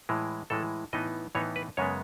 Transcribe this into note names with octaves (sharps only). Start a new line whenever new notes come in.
A2 E3 G#3
A2 E3 G#3 A4
A2 E3 B3 D#4 D#5
A2 E3 B3 D#4 C#5
B4
F#2 C#3 G#3 B3 C#5